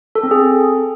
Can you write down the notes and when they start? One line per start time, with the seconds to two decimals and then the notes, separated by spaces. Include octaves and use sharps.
0.15 A4
0.23 C4
0.31 G#4